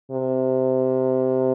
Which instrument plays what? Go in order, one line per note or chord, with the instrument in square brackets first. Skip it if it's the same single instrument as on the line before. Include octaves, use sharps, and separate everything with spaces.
[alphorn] C3